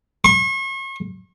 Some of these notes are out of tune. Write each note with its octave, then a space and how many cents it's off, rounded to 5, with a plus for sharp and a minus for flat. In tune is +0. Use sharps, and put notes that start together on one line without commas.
C#6 -40